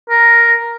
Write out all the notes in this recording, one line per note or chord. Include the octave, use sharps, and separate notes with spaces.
A#4